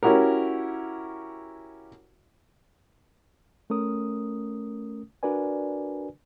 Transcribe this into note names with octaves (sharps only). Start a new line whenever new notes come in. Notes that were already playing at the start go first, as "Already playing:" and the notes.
C#4 E4 F#4 G4 A#4
A3 C#4 A#4 D#6
D4 F#4 A#4 B4 D5 G#5